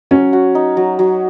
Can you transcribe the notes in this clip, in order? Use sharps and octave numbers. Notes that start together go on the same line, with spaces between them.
F#3 C#4
F#4
D#4
F#3
F#3